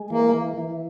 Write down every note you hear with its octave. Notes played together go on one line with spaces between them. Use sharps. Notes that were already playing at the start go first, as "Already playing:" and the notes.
Already playing: G#3
E3 A#3
E3
E3